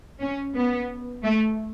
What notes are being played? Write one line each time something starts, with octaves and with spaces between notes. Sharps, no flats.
C#4
B3
A3